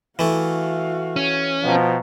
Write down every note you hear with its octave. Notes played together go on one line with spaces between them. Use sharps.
E3 A3 F#4 F5
C#4
B2 F3 G5 A#5